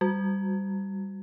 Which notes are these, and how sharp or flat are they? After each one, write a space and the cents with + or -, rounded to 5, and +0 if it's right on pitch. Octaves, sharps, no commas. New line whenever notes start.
G3 +0 F#4 -20